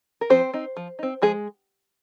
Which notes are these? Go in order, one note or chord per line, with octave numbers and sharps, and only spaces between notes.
A#4
F3 C4 C5
C4 D#4
F3
C4 D#4
F3 G#3 G#4